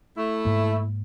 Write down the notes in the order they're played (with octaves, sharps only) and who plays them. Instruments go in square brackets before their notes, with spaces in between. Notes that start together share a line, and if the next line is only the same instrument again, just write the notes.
[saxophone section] A3 E4
[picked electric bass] G#2 A#3